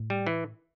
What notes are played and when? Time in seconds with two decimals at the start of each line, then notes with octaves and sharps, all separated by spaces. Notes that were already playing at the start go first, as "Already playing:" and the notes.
Already playing: A2
0.10 G3
0.27 E3